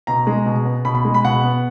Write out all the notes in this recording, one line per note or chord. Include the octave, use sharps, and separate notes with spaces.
B2 A#5
G#3
B2
B3
B2 B5
B5
G#3
B5
B2 F#5
B3